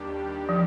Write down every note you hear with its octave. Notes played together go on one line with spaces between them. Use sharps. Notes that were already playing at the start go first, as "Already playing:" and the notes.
Already playing: D#2 D#3 G3 D4 G4
F3